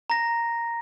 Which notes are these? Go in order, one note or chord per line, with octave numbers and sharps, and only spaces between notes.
A#5 A#6